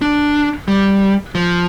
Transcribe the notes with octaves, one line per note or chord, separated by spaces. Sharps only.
D4
G3
F3